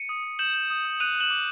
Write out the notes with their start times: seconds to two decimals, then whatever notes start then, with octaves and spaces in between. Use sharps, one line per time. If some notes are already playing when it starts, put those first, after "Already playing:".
Already playing: C#7 D#7
0.09 D#6
0.24 D#6
0.39 G6 E7 F#7
0.54 G6
0.70 D#6
0.85 D#6
1.00 F#6 D#7 F7
1.15 F#6
1.20 E7 F#7
1.31 D6